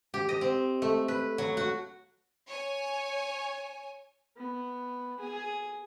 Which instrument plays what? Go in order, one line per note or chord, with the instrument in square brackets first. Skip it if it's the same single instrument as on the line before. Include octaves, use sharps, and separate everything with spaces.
[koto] G4
D#5
C4
A3
B4
F#3
F#4
[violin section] C#5 G#5
[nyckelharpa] B3
G#4